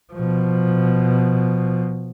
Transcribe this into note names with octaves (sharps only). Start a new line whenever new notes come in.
B2 F3